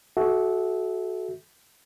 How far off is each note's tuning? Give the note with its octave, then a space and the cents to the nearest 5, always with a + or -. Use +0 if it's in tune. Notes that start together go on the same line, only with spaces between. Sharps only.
F#4 +0 A4 -30 E5 -15